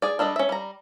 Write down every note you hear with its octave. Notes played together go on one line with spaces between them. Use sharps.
G#4 D5
G3 D4 A4 D#5
C#4 E5
G3 A#5